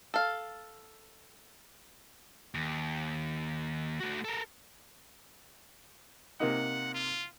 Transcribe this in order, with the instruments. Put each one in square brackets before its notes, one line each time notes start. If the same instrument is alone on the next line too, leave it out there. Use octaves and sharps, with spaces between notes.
[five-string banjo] A4 F5
[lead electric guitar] D#2
A3 F#4
A4 A#4
[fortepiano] C3 A#3 D#4 [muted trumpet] F#5
[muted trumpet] F4